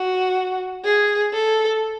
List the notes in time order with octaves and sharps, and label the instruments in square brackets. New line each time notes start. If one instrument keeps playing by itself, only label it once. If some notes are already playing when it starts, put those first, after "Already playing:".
Already playing: [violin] F#4
G#4
A4